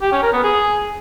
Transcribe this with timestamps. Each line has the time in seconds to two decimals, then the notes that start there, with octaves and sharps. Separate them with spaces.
0.02 G4
0.12 C#4
0.22 A#4
0.33 B3
0.43 G#4